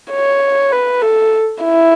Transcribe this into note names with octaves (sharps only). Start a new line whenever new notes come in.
C#5
B4
A4
E4